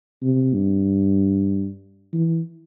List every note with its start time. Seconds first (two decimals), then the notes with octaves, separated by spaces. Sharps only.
0.23 C3
0.54 G2
2.13 E3